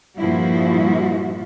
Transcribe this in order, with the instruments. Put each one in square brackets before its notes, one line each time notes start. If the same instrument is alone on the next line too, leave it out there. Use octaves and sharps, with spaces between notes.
[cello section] G2 A#2 F3 G3 E4 F#4